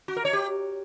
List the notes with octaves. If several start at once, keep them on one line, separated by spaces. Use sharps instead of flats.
F#4
A#4
C#5
G4